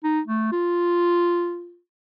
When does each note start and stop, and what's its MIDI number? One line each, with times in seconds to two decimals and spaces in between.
0.04 0.20 63
0.27 0.51 57
0.52 1.79 65